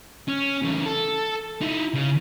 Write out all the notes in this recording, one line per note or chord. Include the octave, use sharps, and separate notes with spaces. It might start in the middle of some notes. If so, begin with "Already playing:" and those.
C#4
C#3 E3
A4
D#4 E4
C#3